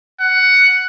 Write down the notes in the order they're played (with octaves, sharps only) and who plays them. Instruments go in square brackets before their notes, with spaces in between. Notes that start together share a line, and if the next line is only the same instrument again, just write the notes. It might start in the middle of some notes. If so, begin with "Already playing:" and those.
[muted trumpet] F#5